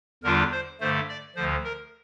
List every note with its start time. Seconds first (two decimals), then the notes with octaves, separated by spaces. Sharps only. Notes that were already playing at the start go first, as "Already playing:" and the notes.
0.24 E2 D3 G3 D4 F4 A#4
0.52 C5
0.80 G2 D3 A3 C5
1.09 D5
1.36 D2 D3 F3 C5
1.64 A#4